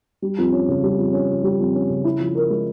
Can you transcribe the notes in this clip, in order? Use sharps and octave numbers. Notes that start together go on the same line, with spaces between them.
G3
F2
C#4
C#3
G3
F2
C#4
C#3
G3
F2
C#4
C#3
E4
F3
A#4
G#3